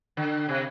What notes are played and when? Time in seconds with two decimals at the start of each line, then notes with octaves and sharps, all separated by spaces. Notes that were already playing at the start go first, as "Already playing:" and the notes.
0.17 D3
0.49 C3